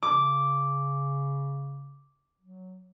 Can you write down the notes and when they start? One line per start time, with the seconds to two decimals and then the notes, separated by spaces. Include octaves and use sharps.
0.03 C#3 D6
2.41 F#3